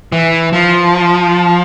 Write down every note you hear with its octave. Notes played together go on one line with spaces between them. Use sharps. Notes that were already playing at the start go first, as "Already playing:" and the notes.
E3
F3